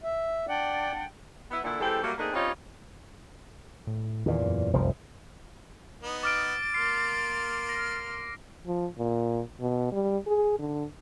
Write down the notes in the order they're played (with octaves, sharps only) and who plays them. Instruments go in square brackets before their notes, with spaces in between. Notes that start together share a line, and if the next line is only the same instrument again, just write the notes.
[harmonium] E5
[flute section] D4 F#5 G5 [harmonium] D5
[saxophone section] B3 E4
A#2 D3 E4
E3 G#3 C4 G4 A4
F#3 G3 A3 A#3
A3 A#3 C4 D4 D#4 G#4
G3 C4 C#4 D#4 F4 C#5
[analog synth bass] A2
[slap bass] E2 A#2 [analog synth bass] D#3
[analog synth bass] F#2
[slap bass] F1 C2 F3
[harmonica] B3 D#4
[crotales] D6 F6 D7 [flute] A6
[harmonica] A#3 C6 F6 [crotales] C7
[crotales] A#6
[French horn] F3
A#2
B2
G3
G#4
D3